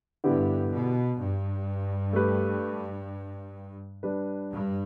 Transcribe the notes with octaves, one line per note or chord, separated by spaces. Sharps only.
G2 D3 B3 E4 G4 B4
B2
G2
A3 G4 B4
G3 D4 B4
G2